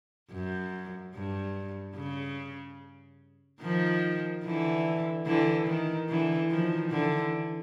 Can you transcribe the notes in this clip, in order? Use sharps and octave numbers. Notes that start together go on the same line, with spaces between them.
F#2
G2
C#3
D#3 F3
D3 E3
D3 E3
D#3
D3 E3
D#3 F3
D3 E3